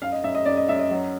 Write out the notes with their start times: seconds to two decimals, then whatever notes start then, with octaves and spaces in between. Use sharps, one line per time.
0.02 F#2 F5
0.12 D#5
0.24 F#2 E5
0.35 D#5
0.46 F#2 D5
0.57 D#5
0.69 F#2 E5
0.79 D#5
0.91 F#3